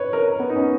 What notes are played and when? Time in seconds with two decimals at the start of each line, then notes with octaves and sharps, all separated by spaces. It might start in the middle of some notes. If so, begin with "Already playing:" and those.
Already playing: B4 C#5
0.13 A#4
0.40 B3
0.49 D#4
0.56 C#4